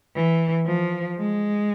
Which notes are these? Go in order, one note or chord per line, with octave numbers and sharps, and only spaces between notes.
E3
F3
G#3